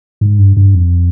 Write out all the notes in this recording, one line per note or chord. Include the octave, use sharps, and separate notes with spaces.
G#2
G2
G2
F2